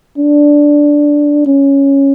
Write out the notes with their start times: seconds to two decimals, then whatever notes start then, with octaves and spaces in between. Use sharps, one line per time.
0.17 D4
1.46 C#4